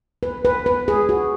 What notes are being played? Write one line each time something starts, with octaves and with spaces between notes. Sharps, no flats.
B4
B4
B4
G#4
F#4